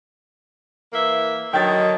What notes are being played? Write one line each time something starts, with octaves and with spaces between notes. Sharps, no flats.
E3 A#3 E5
D3 D#3 F#3 D#5 G5 A6